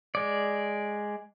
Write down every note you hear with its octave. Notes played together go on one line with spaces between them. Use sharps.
G#3 D5